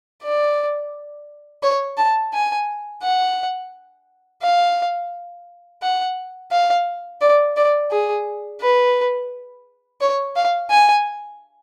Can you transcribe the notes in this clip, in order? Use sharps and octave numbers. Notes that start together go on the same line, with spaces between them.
D5
C#5
A5
G#5
F#5
F5
F#5
F5
D5
D5
G#4
B4
C#5
F5
G#5